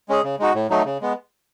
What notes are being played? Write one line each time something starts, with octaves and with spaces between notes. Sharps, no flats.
G#3 C#4 G#4
C#3
G#3 D#4 F#4
A2
F#3 A3 D#4
C#3
G#3 B3